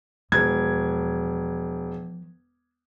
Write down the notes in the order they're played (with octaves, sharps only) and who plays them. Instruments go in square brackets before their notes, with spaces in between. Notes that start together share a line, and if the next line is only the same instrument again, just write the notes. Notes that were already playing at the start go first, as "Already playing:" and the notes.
[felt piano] E1 G#6 [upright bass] E2 F3